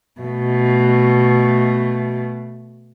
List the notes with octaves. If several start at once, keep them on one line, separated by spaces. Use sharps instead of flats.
B2 A3